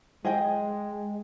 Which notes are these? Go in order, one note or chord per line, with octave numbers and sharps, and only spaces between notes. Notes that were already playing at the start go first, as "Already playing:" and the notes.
G#3 G#4 D#5 G5